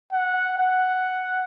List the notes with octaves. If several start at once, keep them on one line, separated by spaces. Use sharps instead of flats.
F#5
F#5